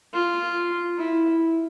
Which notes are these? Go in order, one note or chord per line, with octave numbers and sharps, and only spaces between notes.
F4
E4